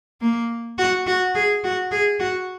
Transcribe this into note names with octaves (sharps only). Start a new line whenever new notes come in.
A#3
F#4
F#4
G#4
F#4
G#4
F#4